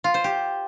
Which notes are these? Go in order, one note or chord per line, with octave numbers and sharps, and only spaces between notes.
F4
C5
G4